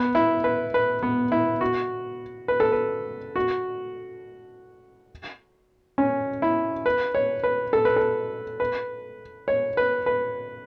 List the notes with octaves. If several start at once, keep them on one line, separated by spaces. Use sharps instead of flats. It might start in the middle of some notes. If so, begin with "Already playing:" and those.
Already playing: B3
E4
B4
B4
B3
E4
F#4
B4
A4
B4
F#4
C#4
E4
B4
C#5
B4
A4
B4
A4
B4
C#5
B4
B4